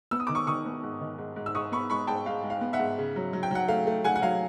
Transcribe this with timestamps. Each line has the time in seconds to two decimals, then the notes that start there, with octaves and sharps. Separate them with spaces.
0.11 B3 E6
0.20 D#6
0.27 D#3 D6
0.35 C#6 D#6
0.47 D#3 C#6 D#6
0.66 B3
0.83 G#2
1.01 D#3
1.18 G#2
1.36 G#2
1.46 E6
1.55 G#2 C#6 D#6
1.72 B3 B5 C#6
1.90 G#3 B5 C#6
2.07 G#2 G5 A5
2.26 G#2 F5
2.43 G#3
2.50 F5
2.61 B3
2.73 E5 F#5
2.79 G#2
2.98 C#3
3.16 F#3
3.33 F#3
3.43 G5
3.51 F#3 F#5
3.68 A3 F5
3.87 A3
4.04 A3 F#5 G#5
4.16 F#5
4.22 F#3 F5